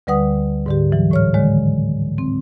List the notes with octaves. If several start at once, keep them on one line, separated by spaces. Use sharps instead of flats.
D2 D3 G3 B4 F#5 D#6
G#2 D3 G4
E3 F#3
A2 C#5 F6
D3 D#3 G#3 C#5
C4